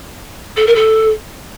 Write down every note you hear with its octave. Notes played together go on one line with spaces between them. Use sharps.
A4
A#4
A4